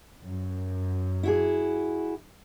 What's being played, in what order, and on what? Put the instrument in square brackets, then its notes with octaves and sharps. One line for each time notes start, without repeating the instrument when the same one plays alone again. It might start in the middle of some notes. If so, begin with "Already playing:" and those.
[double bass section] F#2
[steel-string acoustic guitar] E4 F#4 G#4